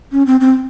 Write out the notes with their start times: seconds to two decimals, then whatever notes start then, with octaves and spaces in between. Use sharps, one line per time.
0.12 C#4
0.26 C4
0.41 C4